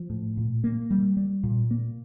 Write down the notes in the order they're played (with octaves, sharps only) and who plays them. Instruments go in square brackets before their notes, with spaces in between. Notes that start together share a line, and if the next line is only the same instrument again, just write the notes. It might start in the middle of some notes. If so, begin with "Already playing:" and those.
Already playing: [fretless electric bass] F3
A2
A#2
A#3
G3
G3
A#2
A#3